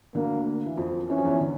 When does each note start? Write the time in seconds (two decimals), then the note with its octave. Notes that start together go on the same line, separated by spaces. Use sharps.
0.15 D2 D3 A#3
0.66 E3
0.77 F2 F3
1.09 E3 C#4
1.18 F3
1.25 E2 E3
1.41 D3